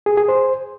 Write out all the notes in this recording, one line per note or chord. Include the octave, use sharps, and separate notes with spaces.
G#4
G#4
C5